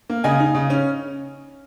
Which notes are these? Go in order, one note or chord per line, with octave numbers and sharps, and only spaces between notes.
A#3
C#3 D#5 G#5
D#4
C#3
C#4